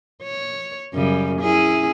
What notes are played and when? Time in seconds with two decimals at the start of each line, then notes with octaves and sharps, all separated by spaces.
0.23 C#5
0.94 F#2 C#3 G3
1.40 C#4 E4 G#4